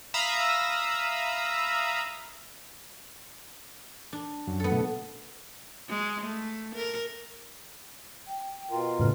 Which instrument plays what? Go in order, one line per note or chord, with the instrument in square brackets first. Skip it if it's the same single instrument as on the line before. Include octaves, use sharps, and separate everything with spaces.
[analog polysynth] E5 F5 A#5 B5 D#6 E6
[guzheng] D4
[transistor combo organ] F#2
[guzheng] B3 A4
[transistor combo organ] B2 A3
[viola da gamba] G#3
A3
A#4
[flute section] G5
[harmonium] B2 F4 A#4
[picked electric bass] A2 C#3 [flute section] A4 B4 F6